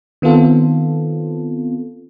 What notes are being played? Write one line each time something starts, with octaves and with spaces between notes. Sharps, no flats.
D#3 B3 C4 F4 A4